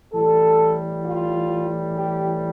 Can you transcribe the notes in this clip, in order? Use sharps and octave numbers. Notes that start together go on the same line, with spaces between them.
A2 E3 G3 A4
F4
G4